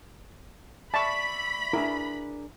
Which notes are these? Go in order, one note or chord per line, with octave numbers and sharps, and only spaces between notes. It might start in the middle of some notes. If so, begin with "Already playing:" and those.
D5 E5 A5 B5 C#6
D4 E4 G#4 A#4